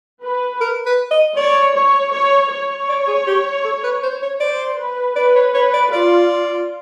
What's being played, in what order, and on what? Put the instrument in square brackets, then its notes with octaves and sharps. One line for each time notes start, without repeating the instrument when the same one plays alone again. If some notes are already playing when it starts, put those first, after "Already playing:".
[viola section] B4
[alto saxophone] A#4
B4
D#5
[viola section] C#5 [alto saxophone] D5
[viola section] C#5
C#5
C#5
[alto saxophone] D5
G#4
G4
A4
B4
C5
C#5
[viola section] C5 [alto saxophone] D5
[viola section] B4
[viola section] B4 [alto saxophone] D5
[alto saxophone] C#5
[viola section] B4 [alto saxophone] C#5
[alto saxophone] D5
[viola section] F4 [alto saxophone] D5